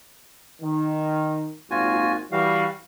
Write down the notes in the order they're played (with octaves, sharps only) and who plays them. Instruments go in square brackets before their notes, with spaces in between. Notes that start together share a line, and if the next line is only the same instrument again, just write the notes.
[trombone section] D#3
[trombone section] G#1 A#2 [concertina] F4 F#4 G#5
[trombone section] E3 G3 [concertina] F#4 F5